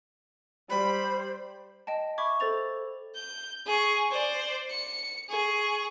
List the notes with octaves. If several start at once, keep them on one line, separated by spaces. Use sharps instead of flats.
G3 C5 B5
D#5 G5 A5
E5 B5 C#6 D6 G#6
A4 C5 A6 F7
G6
G#4 C#6
C5 D5
C#7
G#4 C#6